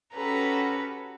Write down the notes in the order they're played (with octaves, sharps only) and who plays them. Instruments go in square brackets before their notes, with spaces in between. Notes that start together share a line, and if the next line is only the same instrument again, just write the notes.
[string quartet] C#4 F#4 G4 A4 B4 A#5